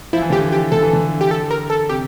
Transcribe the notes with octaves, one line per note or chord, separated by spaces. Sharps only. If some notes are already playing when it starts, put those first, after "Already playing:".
F3 E4
E3
D3 G4
E3
G4
D3 A4
E3
D3
G4
A4
A#4
A4
C3 G4